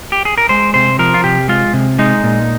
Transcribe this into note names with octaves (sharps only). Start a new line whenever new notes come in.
G4
G#4
A#4
G#3 C5
C3 C5
F3 A#4
F4
C3 G4
G#3 F4
C3
G#3 D#4
A#2